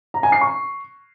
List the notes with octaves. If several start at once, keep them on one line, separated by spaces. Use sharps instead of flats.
A#5
G#5
C7
C#6